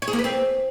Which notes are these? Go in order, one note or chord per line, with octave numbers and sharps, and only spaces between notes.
C#5
G#4
A#3
B4
C4